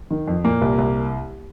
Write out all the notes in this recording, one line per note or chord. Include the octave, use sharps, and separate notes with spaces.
D#3
F2
A#2 A#3
C2
C2